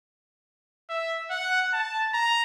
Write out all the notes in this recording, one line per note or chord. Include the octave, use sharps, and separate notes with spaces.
E5
F#5
A5
A#5